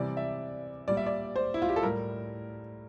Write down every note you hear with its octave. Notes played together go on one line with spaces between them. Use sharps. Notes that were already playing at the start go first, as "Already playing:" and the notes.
Already playing: C3 E3 G3 D5
E5
A#2 G3 D5
E5
D5
C5
E4
F4
G4
A4
A2 G3 A#4